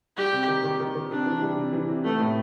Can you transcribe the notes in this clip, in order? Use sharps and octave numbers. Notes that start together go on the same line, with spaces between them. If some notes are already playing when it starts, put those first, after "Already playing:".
G3 G4
C3
D#3
D#3
D#3
D#3
C3 D4
E3
G3
C3
E3
C3
A3 B3
A2